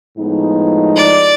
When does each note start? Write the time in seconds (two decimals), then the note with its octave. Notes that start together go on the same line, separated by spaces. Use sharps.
0.17 A2 F3 G#3 B3 D#4
0.96 D5